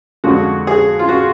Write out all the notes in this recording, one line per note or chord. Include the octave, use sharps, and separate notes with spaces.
F2 D3 F3 G#3 F#4
G#4
F4
F#4